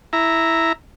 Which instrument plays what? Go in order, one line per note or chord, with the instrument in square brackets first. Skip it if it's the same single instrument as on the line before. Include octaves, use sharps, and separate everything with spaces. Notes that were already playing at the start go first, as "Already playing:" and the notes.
[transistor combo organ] E4 A#5